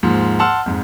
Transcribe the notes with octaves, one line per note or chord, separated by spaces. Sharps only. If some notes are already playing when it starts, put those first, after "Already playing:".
D#2 G#2 F3
F#5 A5 C6 E6 F6
F2 G#2